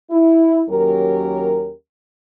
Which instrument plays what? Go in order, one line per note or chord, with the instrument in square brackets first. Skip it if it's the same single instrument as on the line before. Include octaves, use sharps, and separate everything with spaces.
[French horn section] E4
D#2 F#3 C#4 G4 A#4